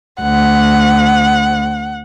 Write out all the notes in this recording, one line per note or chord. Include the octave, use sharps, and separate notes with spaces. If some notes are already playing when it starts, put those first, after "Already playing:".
D2 F#5